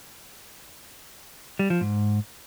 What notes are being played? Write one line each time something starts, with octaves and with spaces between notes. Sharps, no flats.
G3
F3
G#2